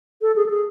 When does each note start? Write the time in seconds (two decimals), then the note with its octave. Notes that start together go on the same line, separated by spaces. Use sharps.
0.22 A4
0.36 G#4
0.46 A4
0.50 G#4